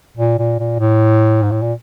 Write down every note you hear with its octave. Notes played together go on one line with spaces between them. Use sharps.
A#2
A#2
A#2
A2
G#2
A2
A#2